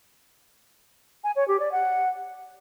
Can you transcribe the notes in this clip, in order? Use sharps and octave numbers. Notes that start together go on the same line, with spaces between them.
G#5
C#5
G4
D5
F#5